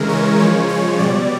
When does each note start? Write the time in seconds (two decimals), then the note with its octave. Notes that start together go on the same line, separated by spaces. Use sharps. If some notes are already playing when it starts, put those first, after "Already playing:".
Already playing: C#3 E3 G#3 A#4
0.09 C#5
0.38 C#3 F3 G#3 C#5
0.69 C#5
0.99 B2 G3 D5